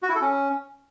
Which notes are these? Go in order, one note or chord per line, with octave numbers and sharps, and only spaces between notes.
F#4
E4
A4
C#4